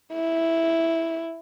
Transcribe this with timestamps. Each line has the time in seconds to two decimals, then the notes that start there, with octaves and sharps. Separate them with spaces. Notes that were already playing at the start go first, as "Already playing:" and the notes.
0.13 E4